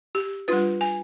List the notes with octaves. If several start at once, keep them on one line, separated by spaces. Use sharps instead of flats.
G4
G3 D4 F4 B4
G#5